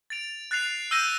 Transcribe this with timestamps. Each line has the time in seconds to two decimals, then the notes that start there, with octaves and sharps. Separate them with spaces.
0.10 A6 D7 F7
0.51 F#6 A6 C7 F7
0.91 E6 G6 A#6 D#7 G7